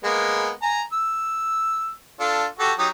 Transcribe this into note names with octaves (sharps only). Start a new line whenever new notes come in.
G#3 A#3 B3
G#5 A#5
E6
D4 F4 A4
F#4 G4 A4
F#3 D#4 G4